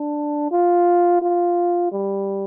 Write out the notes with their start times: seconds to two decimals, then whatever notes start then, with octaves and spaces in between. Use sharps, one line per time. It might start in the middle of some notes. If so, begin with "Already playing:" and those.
Already playing: D4
0.51 F4
1.22 F4
1.92 G3